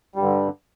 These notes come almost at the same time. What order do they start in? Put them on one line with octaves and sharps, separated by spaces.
G3 G2 D3